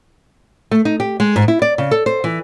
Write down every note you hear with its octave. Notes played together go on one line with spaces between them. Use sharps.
A3
D#4
G4
G#3
G#2
E4
D5
C#3
A4
C5
E3